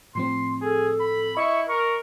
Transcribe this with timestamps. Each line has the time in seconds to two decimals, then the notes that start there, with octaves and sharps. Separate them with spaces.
0.15 A2 F3 C4 C6
0.62 G#4 A4
1.00 B5
1.37 E4 D#5 C#6 C#7
1.69 A#4 C#6